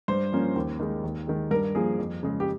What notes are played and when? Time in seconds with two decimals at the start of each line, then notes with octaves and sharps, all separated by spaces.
0.08 G2 C5
0.32 F3 A#3 C#4
0.56 D#2
0.80 D#3 G#3
1.04 D#2
1.27 D#3 G#3
1.51 G2 A#4
1.75 F3 A#3 G#4
1.99 F2
2.23 C#3 G#3
2.40 G4